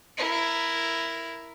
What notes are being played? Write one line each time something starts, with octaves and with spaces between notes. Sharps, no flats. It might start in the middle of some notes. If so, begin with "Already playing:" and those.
E4 A#4